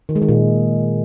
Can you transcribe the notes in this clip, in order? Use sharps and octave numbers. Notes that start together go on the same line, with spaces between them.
D#3
G#3
D#3
A#2